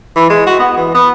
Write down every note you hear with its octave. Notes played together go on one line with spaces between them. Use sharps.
E3
G#3
F#4
B3
E3
B3